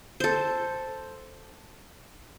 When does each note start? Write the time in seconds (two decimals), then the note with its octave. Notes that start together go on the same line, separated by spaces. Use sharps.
0.20 A4 C5